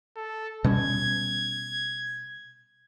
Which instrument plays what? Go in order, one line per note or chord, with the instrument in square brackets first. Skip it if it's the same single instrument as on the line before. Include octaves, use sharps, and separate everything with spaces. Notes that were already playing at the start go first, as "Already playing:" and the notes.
[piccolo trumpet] A4
[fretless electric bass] B2 G3 C#4 [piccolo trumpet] G#6